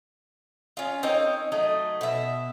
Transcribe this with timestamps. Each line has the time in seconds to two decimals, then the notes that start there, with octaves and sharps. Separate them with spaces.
0.77 C#4 F4
1.03 C4 D#4 A#4 C#5
1.52 F#3 A3 D#4
2.01 B2 E5